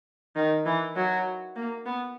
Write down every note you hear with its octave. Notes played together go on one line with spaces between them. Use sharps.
D#3
E3
F#3
A#3
B3